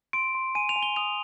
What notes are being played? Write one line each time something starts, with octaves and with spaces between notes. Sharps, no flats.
C6 D7
C6
G#5 D#7
F7
G#5
G7
D#6 F7